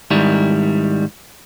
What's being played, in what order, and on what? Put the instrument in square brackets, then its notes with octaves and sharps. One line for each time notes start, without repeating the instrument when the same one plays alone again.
[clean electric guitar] G#2 D#3 G3 E4